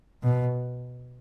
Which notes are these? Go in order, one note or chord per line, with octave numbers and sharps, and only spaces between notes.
B2